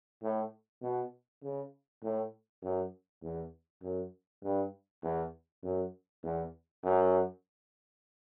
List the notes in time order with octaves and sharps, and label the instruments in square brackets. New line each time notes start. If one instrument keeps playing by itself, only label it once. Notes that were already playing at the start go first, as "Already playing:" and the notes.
[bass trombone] A2
B2
C#3
A2
F#2
E2
F#2
G2
E2
F#2
E2
F#2